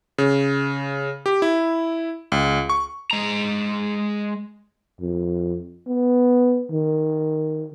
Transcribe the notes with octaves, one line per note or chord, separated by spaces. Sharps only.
C#3
G4
E4
C#2
C#6
G#3 A#5
F2
B3
D#3